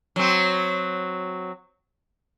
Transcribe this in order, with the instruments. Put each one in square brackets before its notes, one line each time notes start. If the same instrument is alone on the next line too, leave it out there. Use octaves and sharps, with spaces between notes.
[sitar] F#3 C4